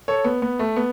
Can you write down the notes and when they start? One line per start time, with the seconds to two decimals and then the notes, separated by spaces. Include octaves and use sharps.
0.08 A4 C#5
0.24 B3
0.42 B3
0.59 A3
0.76 B3